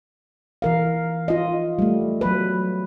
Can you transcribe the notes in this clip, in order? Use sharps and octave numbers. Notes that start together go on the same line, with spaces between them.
E3 A#4 F5
F4 D#5
G3 A3
F#3 B4